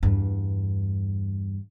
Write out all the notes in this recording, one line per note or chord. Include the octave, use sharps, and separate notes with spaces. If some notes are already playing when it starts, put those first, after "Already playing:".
E2 G2